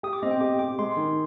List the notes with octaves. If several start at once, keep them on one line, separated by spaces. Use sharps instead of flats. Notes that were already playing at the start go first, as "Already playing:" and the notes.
G4 D#6
D6
C4 D#5
G5
G4 D6
G4 D6
G#3 C6
D#3